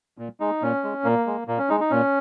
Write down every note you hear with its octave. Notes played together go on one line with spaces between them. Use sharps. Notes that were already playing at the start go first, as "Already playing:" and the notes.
A#2
G#3 D#4
A#2 C#4
G#3
A#2 A#3
G#3
A#2 A#3
C#4
G#3 D#4
D#4
A#2 C#4